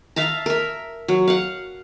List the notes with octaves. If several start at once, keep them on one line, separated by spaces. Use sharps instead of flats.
E5 F5 A5 A#5
A#4 E5
F#3
F5 F#5